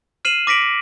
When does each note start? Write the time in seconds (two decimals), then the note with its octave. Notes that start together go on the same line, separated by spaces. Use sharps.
0.25 F6 C7 D#7 E7 F#7
0.47 D6 A#6 B6 D7 F#7
0.61 D7